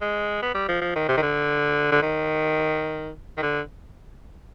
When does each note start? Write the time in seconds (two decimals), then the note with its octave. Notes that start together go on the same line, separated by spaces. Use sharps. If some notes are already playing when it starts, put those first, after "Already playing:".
0.02 G#3
0.42 B3
0.54 G3
0.69 F3
0.81 F3
0.96 D#3
1.09 C3
1.17 D#3
1.22 D3
1.92 D3
2.02 D#3
3.38 D#3
3.42 D3